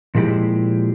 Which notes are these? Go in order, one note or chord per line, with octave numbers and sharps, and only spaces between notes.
A#2 F3 G#3 E4 G4